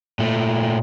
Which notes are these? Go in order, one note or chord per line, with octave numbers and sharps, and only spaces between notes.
A#2 A3